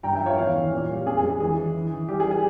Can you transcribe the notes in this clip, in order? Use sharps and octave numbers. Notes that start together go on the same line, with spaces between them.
G2 G5 A#5
E5 G5
F3
C#5 F5
E2 C#5 F5
E3
A#2
G3
F2 G#4
G#4
G#3
G#4
E3 G#4
E3
E3
E3
G3 G4
G#4
G3
G#4